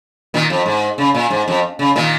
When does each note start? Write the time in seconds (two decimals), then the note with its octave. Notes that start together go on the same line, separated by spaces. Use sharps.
0.34 A#2 D#3
0.50 F2
0.66 G#2
0.98 C#3
1.15 A#2
1.30 G#2
1.48 F2
1.79 C#3
1.96 A#2 D#3